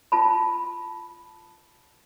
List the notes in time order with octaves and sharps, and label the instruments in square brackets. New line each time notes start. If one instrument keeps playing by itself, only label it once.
[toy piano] F4 A5 B5